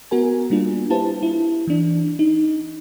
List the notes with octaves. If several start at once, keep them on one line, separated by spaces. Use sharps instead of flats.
B3 F#4 A#4 G#5
G3 A#3 D4 F4
E4 F4 G4 B4 C5 A5
E4
E3 D4
D#4